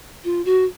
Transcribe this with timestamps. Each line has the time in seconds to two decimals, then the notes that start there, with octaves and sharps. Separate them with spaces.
0.24 F4
0.45 F#4